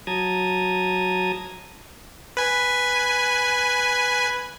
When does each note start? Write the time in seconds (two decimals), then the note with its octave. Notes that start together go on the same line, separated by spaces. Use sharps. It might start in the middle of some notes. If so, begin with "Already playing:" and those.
0.07 F#3 A5 A#5 D#6 G#6
2.37 B4 G#5